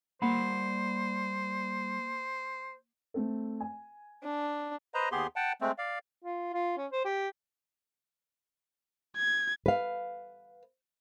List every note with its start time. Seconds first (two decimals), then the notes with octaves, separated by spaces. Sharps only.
0.22 G3 A#3 C5 F#5 B5
3.14 A3 C4 A4
3.60 G#5
4.23 D4
4.94 B4 C5 D#5 A#5
5.12 D#2 B3 G4 G#4 C6
5.36 F#5 G5 A5
5.61 G#3 A3 C4
5.78 D5 F5
6.24 F4
6.54 F4
6.77 C#4
6.92 C5
7.05 G4
9.17 G#6
9.66 B4 F5